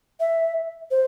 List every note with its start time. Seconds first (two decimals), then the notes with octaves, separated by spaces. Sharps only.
0.20 E5
0.90 C5